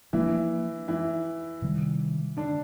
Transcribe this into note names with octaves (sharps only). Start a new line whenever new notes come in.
E3 F3 A#3 D4 E4
E3 E4
C3 D#3 G3
D3 D4